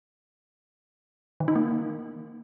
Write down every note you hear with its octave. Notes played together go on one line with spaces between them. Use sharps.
D#3
D#4
A#3